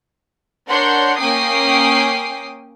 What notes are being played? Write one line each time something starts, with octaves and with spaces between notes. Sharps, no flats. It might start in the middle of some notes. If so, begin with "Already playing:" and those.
D4 A#4 C#5 F#5 C6 G6
A#3 C#4 G5 D6 D#6 C7